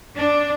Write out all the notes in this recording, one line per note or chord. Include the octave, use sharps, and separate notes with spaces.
D4